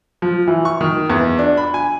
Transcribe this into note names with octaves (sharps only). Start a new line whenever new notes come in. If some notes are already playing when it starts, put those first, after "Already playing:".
F3
E3
C#6
D#3
E2
D4
B5
G#5